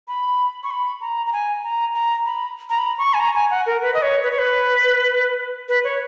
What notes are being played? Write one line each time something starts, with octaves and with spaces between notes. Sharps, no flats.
B5
C#6
B5
A#5
A#5
G#5
A#5
A#5
B5
A#5
B5
C#6
G#5
A#5
G#5
F#5
A#4
B4
D#5
C#5
B4
C#5
B4
B4
C#5